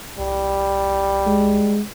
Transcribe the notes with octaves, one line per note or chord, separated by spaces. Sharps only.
C2 G3
G#3